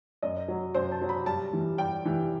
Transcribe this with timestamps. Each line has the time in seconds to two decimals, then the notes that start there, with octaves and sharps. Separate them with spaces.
0.22 F#2 D#5
0.48 F#3
0.75 F#2 C5
0.92 A5
1.02 F#3
1.09 B5
1.26 G2 A5
1.53 E3 G3
1.78 G2 G5
2.04 E3 G3